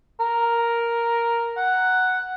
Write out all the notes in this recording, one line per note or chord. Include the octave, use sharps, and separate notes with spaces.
A#4
F#5